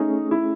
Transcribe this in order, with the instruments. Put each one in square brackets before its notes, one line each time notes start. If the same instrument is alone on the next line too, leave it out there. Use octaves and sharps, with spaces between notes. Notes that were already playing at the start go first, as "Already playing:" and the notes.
Already playing: [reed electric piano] A3 C#4 G#4 C#5 [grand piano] D#4
[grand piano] E4